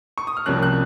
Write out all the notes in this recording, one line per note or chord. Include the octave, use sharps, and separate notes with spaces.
C#6
D#6
F6
C2 C3 F3 A#3 C#4 F#6
F#6